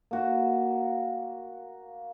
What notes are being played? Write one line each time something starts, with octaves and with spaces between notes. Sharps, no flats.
A#3 F#4